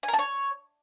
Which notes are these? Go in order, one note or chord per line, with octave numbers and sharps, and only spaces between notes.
G#5
A#4
A5
C#5